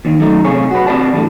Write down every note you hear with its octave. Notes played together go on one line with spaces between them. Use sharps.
D#2 D#3
F#2 A3 D#4
C3 G#4 C#5
F#4 B4
C4 G4 D5 A5
E2 A2 D3